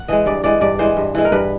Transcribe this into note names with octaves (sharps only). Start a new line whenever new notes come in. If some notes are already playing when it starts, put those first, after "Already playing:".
Already playing: F#5
E3 G#3 D#5
G2 D5
E3 G#3 D5
G2 D5
E3 G#3 C5
G2
E3 G#3
A#4
G2 B4